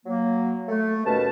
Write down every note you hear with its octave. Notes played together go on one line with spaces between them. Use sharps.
F#3 A#3
A3
D#2 B2 C#4 B4 A5